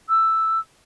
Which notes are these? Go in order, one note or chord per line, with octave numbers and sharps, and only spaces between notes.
E6